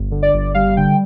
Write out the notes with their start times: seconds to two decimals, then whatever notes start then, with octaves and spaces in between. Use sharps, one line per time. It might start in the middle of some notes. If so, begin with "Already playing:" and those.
Already playing: G1
0.12 D3
0.23 D5
0.33 G1
0.55 G3 F5
0.77 D3 G5